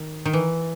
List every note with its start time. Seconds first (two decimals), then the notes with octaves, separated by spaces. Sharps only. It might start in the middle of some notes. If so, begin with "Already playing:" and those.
Already playing: D#3
0.26 D#3
0.33 E3